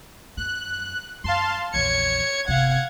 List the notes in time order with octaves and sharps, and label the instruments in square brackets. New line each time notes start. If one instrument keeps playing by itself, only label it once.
[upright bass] F#2 [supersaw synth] F#6
[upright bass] F#2 [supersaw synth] F5 A5 C6
[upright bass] A#1 E2 [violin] C#5 C#7 [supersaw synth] G#6
[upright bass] G1 C3 [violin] F5 F#5